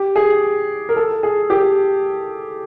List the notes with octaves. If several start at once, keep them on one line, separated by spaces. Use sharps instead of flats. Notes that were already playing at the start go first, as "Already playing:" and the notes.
Already playing: G4
G#4
A#4
A4
G#4
G4